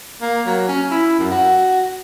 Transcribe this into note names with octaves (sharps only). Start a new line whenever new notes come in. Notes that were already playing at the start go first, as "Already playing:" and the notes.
A#3
F#3
C#4
E4
F#2
F#4